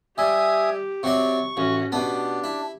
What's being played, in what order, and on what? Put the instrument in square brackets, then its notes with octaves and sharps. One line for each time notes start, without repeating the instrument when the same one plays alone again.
[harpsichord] G3 [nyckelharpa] G4 [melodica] E5 G#5 D#6
[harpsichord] C3 F#3 D5 [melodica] C#6
[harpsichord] A1 [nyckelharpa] C#4 F#4
[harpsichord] B2 B3 [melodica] D4 [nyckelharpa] G4
[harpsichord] E4